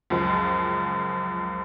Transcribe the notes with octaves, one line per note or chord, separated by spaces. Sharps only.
C#2 F#2 F3